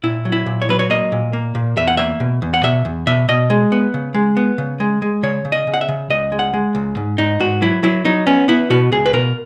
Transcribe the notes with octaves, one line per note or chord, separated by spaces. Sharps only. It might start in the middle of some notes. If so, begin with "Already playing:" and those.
A#2 E4
F#3
E4
A#2
C#5
F#3 B4
C#5
A#3 D#5
A#2
A#3
A#2
E2 E5
F#5
A#3 E5
B2
E2
F#5
B2 E5
E2
B2 E5
B2 D#5
G#3
B3
C#3
G#3
B3
C#3
G#3
G#3
C#3 C#5
C#3
D#5
C#3
F#5
E5
C#3
C#2 D#5
G#3
F#5
G#3
C#2
G#2
G#2 D#4
G#2 F#4
F#3 E4
F#3 E4
F#3 D#4
B3 C#4
B3 E4
B2 F#4
C#2 G#4
B4
B2 A#4